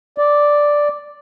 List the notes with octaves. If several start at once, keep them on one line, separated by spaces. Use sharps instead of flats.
D5